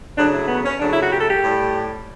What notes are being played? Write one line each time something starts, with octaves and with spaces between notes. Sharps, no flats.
C#3 F#3 A3 D4
E4
B3
C#4
C#3 F#3 A3 D4
E4
F#4
G4
A4
G4
A2 G3